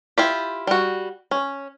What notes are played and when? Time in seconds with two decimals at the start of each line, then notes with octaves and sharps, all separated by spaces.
0.18 E4 F4 G4
0.67 G3 F#4
1.31 C#4